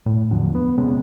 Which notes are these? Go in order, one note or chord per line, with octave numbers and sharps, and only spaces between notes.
A2
E2 D3 F3 F#3
B3
C3 G#3 B3 C#4